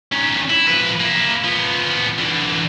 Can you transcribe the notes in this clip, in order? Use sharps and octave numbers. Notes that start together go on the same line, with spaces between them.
D#3 C#4
E4
F3 B4
A#3 E4
F3 B3
D3 E3